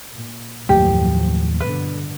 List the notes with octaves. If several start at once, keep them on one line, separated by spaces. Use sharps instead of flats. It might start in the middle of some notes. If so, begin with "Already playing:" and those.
A#2
F#1 D#2 A2 F3 F#3 A3 G4
G2 B2 D3 B4